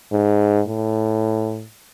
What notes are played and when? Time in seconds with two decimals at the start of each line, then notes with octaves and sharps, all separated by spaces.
0.12 G#2
0.67 A2